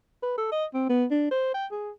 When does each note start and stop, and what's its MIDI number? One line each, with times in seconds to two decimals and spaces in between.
0.23 0.37 71
0.38 0.50 69
0.52 0.65 75
0.74 0.88 60
0.89 1.05 59
1.11 1.30 62
1.31 1.54 72
1.54 1.66 79
1.71 1.91 68